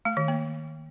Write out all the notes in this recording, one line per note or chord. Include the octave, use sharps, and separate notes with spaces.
A3
D#3
A#3